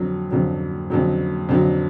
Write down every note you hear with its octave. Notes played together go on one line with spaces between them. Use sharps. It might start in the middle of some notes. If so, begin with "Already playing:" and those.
Already playing: F2 D3 F#3
F2 D3 F#3
F2 D3 F#3
F2 D3 F#3